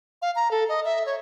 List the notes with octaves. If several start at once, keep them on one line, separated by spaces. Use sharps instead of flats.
F5
A#5
A4
D#5
E5
C#5